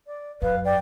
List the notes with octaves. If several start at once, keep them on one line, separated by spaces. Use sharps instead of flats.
D5
F#2 B4 F5
D5 G5